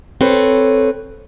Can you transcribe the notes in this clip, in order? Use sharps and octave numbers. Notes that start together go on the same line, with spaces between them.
C4 A4 B4 C#5